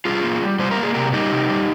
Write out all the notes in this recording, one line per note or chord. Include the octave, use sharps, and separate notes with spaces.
G3 F4 G#4
A#3
G3
G3 C5
A#4
A#3
G#4
C3 G4 A#4
G3 D#4 G4
C3
G3